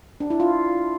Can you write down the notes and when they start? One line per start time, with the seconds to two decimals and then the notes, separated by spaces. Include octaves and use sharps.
0.20 D4
0.30 E4
0.40 F4